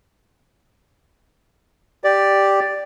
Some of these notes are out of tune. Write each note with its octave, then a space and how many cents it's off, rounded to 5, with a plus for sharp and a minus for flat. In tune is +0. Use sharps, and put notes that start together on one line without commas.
G4 +0 D5 +0